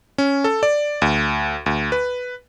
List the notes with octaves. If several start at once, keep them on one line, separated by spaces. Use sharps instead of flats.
C#4
A4
D5
D2
D2
B4